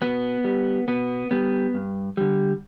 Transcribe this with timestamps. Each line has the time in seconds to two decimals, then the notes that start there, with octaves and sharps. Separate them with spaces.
0.02 B2 B3
0.44 G3
0.88 B2 B3
1.31 G3 B3
1.74 G2
2.17 D3 G3